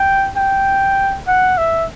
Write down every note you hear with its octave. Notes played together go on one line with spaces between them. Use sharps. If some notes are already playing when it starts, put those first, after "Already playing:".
Already playing: G5
G5
F#5
E5